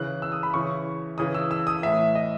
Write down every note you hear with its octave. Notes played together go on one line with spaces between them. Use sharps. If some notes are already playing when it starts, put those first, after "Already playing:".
Already playing: C#3 E3 F#6
E6
D#6
B5
C#3 E3 C#6
C#3 E3 D#6
E6
E6
D#6
A2 E3 E5
D#5